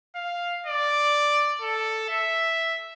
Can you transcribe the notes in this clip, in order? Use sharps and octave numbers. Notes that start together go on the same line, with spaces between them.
F5
D5
A4
E5